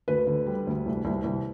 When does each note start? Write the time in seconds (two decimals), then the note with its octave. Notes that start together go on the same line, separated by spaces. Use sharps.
0.08 D2 B4
0.27 D3
0.47 G3
0.67 D2
0.86 C2
1.05 C2
1.24 C2